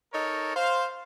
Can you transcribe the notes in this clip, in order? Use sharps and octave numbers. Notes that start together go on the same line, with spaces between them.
D#4 A4 A#4 C#5
C5 F5